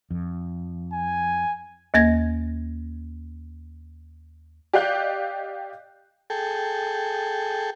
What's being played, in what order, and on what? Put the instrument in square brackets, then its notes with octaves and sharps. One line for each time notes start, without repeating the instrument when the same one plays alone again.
[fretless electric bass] F2
[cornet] G#5
[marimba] D#2 A#3 G#6 A#6
[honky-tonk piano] G4 D5 D#5 F5 F#6 G6
[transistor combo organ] G#4 A4 G5